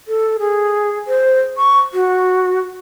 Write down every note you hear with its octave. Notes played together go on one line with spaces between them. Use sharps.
A4
G#4
C5
C#6
F#4